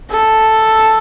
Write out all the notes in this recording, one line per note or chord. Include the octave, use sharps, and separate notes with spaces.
A4